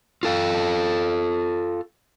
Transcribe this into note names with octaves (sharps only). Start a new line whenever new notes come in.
F4 A4 F5